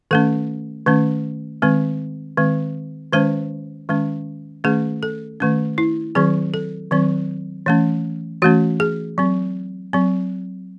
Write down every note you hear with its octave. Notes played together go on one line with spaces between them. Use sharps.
D#3 A3 C#4 A4
D#3 A3 C#4
D#3 G#3 C4
D#3 G#3 C4
D#3 G#3 C#4 C5
D#3 G#3 C#4
D#3 A3 C#4 G#4
A4
D#3 A3 C#4
E4
D#3 F#3 C4 G#4
A4
D#3 F#3 C4
E3 A3 C#4
E3 A3 C#4 F#4
G#4
F#3 C4
F#3 C4